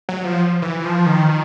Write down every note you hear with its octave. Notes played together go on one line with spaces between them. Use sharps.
F#3
F3
E3
F3
D#3